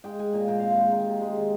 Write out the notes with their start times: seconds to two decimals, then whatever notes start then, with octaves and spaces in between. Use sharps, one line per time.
0.04 G#3 G5
0.19 G#3 G#5
0.34 A#2 G#5
0.48 A#2 G5
0.59 C4 F5
0.70 F5
0.77 G#3 G5
0.92 D#3
1.07 C3
1.21 G#3
1.36 D#3